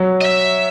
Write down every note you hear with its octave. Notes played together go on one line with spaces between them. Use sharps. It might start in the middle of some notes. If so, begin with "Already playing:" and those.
Already playing: F#3
D#5
E5